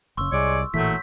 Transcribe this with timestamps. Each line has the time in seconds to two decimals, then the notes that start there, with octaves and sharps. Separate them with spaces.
0.17 F#1 C#3 C6 C#6 E6
0.32 C2 G#3 C#5 D5
0.74 A1 A#2 E3 F#3 A3 G6 B6